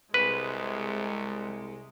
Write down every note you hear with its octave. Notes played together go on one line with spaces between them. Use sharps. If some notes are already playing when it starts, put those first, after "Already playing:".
C2 C3 G#3 B4